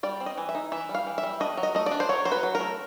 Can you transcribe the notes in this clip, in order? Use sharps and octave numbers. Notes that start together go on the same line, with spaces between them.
G3 D5
C4
D#5
E3
E5
D#4
E3 E5
G3
F5
E3
E5
G3
D4 D#5
F#3
D#5
A3 D#5
D5
D4
C5
F#3 C#5
F#3 C5
B4
F#3
A#4
A3